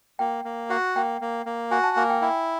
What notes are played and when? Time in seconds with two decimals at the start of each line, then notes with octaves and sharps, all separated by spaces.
0.19 A#3 G5
0.45 A#3
0.70 F#4 F#5
0.96 A#3 G5
1.21 A#3
1.46 A#3
1.71 F#4 G#5
1.84 A5
1.97 A#3 G#5
2.10 G5
2.22 E4 G5